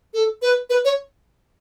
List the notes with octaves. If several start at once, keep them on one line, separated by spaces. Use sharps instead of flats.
A4
B4
B4
C#5